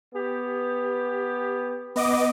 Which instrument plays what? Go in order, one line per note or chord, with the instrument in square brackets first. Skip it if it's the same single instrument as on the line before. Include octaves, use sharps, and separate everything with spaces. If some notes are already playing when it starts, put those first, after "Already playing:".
[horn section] B3 G4
[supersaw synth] B3 D#5 D6